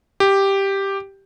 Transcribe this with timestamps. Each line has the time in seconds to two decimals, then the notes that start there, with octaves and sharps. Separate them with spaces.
0.20 G4